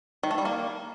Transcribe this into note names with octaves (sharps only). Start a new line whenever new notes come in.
D#3
A3
G3
A#3